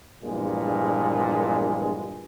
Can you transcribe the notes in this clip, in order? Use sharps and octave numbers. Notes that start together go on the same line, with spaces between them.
A#1 E2 G2 A#2 G#3